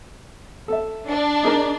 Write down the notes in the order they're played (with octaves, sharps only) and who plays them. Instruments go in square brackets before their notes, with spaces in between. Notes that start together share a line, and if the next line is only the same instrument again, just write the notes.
[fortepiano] A4 E5
[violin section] D4
[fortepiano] D#4 G#4 A#4